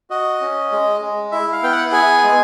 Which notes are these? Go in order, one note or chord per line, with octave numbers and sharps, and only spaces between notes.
F#4 D#5
C#4
G#3
G#3
E4 E5
F5
B3 G5
F#5
G#4 G#5
G#3